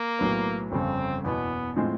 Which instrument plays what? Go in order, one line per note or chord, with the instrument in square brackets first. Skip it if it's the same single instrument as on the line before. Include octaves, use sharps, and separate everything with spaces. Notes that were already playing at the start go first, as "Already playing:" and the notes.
Already playing: [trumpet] A#3
[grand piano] B1 A2 F#3 B3
[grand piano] G1 F2 C#3 [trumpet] C4
[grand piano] F#1 E2 B2 [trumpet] B3
[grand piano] A2 F3 G#3 C4